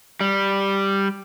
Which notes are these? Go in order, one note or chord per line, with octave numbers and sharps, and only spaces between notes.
G3